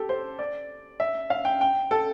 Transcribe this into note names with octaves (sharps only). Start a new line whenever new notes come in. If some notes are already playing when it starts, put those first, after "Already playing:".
Already playing: G4 A4
C5
D5
E5
F5
G5
G5
A4